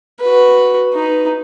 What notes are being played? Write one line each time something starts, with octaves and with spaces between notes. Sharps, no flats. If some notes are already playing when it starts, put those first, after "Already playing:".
F#4 B4
D#4 B4